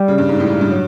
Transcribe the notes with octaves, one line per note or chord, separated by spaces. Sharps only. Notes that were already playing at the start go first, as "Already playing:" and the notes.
Already playing: G3
C#3
G2
G#2
A2
G#2
G2
F#3